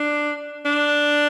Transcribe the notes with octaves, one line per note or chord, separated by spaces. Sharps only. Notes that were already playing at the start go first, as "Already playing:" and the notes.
Already playing: D4
D4